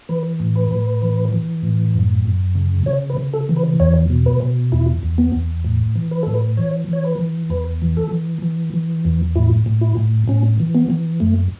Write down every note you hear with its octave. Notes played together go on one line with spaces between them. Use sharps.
E3 B4
A2
B4
A2
E3
E3
A2
F#2
F#2
C#3
C#3 C#5
B4
C#3
A4
E3
B4
E2 C#5
B2
B4
B2
E2 E4
E2
B3
E2
A2
E3
B4
A2 A4
B4
E3 C#5
E3 C#5
B4
E3
E2 B4
E3
A4
E3
E3
E3
E2
A2 E4
A2
E4
A2
A2 C#4
E3
B3
E3
F#2 A3